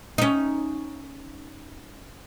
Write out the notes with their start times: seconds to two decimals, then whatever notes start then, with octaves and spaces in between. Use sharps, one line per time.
0.18 C#4 D#4